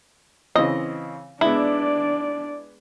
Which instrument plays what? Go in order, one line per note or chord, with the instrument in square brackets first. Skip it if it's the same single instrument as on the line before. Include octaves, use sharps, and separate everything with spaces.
[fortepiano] C#3 E3 C4 [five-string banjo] D#5
[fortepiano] G#3 B3 [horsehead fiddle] D4 D5 [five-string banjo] E4